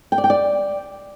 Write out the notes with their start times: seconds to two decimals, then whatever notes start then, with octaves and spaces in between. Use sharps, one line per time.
0.12 G5
0.18 D5
0.24 G5
0.30 D5